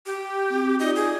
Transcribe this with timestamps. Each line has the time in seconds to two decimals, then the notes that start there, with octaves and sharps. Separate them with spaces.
0.06 G4
0.50 C4 F#4
0.79 D#4 F4 D5 D#5
0.95 G#4